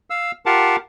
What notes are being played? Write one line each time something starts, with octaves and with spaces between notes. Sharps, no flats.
F5 E6
F4 G4 A#4 F5 F#5 A5